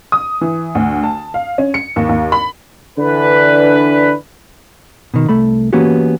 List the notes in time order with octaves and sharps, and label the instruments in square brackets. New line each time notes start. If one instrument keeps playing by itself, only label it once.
[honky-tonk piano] D#6
E3
D2
A5
F5
C#4
C#7
D#2
D#2
B5
[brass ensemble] D3 E3 D4 B4
[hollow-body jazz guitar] B2 D#3
C2 A3 A4 B5
E3 A#3 B3 C#4 F#4 G4